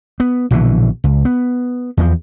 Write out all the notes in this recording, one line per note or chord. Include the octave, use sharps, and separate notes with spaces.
B3
A#1 B2 D3 E3
C#2
B3
E2 E3 F3